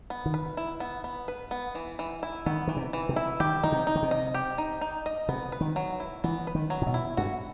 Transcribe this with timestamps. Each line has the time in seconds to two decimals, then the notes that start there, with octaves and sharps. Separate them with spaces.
0.10 B3
0.26 D#3
0.34 B4
0.57 E4
0.80 B3
1.04 B3
1.28 B4
1.51 B3
1.75 E3
1.99 E3
2.23 E4
2.46 D#3 B3
2.67 D#3 E3
2.77 C3
2.93 E3
3.09 C3
3.16 E4
3.40 D#3 G4
3.63 D#3 D#4
3.72 C3
3.87 D#4
3.95 D#3
4.03 C3
4.11 D#5
4.34 G4
4.58 D#4
4.81 D#4
5.06 D#5
5.29 C3 B3
5.52 B4
5.61 D#3
5.76 F#3
6.00 E4
6.24 E3 B3
6.47 B4
6.55 D#3
6.70 F#3
6.82 A2
6.86 B2
6.94 E4
7.17 G2 F#4